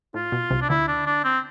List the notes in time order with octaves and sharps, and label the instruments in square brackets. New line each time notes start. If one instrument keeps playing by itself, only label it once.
[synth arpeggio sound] A2 [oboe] F4
[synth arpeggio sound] B2
C2 C3
[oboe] D4
[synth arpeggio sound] D2 D3 [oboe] E4
[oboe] D4
D4
C4